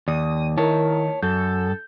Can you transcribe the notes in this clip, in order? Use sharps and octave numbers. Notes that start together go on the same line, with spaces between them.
D#2 D5 D#6
D#3 E4 A#4 C#5 A5
F#2 A4 G6